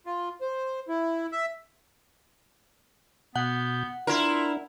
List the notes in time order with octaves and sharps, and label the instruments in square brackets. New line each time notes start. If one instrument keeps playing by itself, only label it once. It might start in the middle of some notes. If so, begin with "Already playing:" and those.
[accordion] F4
C5
E4
E5
[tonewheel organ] B2 G6 [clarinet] B3 [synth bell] F#5
[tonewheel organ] D4 [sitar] E4 A#4 [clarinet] F4